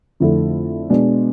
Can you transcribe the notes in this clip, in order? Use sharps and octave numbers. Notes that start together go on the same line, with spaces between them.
F2 D3 A3 E4 A4
B2 G#3 D4